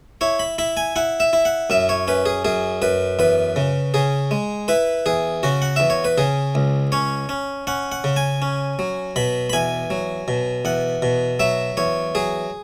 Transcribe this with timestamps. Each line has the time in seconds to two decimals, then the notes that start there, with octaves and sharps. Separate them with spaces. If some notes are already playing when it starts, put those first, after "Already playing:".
0.21 E4 C#5
0.39 B5
0.58 E4 B5
0.77 G#5
0.96 E4 F#5
1.20 E5
1.33 E4
1.45 F#5
1.70 F#2 E5
1.89 C#5
2.08 C#4 B4
2.26 G#4
2.45 F#2 G#4
2.82 F#2 B4
3.19 E2 B4
3.56 C#3
3.94 C#3 G#4
4.31 G#3
4.68 E4 B4
5.06 E2 G#4
5.43 C#3 F#4
5.62 F#5
5.76 E2 E5
5.90 C#5
6.04 B4
6.18 C#3 G#4
6.55 C#2
6.92 C#4 C#5
7.29 C#4
7.67 C#4 F#5
7.92 F#5
8.04 C#3
8.16 G#5
8.42 C#4
8.79 F#3
9.16 B2 B5
9.50 B5
9.53 E2 G#5
9.90 F#3
10.28 B2
10.65 E2 F#5
11.02 B2
11.39 F#3 E5
11.77 E2 C#5
12.15 F#3 G#4